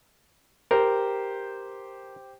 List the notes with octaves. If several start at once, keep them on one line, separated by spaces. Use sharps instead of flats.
G4 A#4 C5